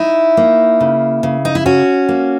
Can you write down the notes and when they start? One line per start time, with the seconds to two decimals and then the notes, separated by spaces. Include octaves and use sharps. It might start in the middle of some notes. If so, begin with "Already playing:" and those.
Already playing: D#4 E4
0.37 A#3
0.80 C#3
1.23 C#3
1.45 D#4
1.55 E4
1.66 C#4 F#4
2.09 A#3